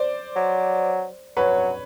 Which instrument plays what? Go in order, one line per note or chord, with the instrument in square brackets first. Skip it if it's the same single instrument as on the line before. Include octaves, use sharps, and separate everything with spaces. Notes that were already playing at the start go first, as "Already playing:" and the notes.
Already playing: [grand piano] C5 D5
[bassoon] F#3
[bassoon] F#3 [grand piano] B4 C#5